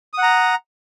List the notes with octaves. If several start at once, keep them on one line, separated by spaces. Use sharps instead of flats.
F#5 A#5 D#6